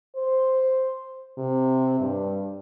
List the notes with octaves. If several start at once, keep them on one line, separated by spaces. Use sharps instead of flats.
C5
C3
G2